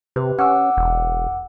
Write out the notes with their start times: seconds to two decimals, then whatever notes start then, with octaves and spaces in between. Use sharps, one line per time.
0.16 C3 G4 B4
0.39 C#4 F#5 D6 E6
0.77 E1